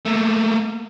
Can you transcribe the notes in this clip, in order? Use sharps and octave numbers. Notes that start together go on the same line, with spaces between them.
A3 A#3